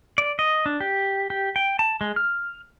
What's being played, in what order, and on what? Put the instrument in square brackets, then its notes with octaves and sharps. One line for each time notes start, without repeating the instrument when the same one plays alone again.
[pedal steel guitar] D5
D#5
D4
G4
G4
G5
A5
G#3
F6